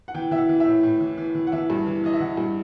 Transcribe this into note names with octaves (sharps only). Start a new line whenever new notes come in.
F#5
E3 G5
E3 E5
F#5
E3
E5
A2
A2
E3
E3
E3
F#5
E3 E5
G2
E3
E3 D#5
E5
E3 F#5
G2